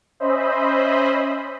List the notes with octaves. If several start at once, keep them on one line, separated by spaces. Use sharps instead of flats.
C#4 C5 D#5 E5 B5